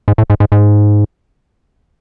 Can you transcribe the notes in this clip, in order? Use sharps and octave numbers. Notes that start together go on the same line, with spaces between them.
G#2
A2
G#2
G#2
G#2